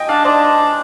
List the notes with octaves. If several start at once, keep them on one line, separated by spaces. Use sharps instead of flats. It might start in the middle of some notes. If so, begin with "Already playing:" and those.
Already playing: D#5 G5 G#5
D4 D5 F5
D4 C5 D#5